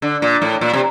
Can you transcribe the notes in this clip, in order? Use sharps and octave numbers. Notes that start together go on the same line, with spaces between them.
D3
A#2
A2
A#2
C3